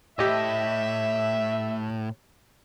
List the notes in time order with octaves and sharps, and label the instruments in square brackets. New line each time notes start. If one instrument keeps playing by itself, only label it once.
[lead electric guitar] A2 [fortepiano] G4 D#5 [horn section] E5